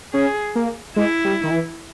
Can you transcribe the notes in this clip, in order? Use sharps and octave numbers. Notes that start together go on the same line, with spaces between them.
C#4 G#4
A#3
G#3 E4
G3
D#3
E3